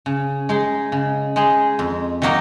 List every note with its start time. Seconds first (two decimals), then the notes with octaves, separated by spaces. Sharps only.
0.06 C#3
0.49 G#3 D#4 G#4
0.92 C#3
1.36 G#3 D#4 G#4
1.79 F2
2.22 D#3 F#3 A#3 D#4